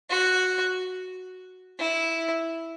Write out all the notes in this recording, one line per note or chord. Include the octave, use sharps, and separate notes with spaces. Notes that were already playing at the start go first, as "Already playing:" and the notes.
F#4
E4